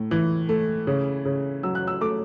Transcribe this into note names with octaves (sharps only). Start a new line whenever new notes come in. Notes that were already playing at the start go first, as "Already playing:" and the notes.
Already playing: A2
E3
A3
C#3
C#3
F#3 E6
F#6
E6
A3 D6